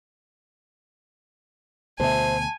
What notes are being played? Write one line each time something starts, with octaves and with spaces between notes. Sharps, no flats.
D2 B2 C5 E5 G#5 A5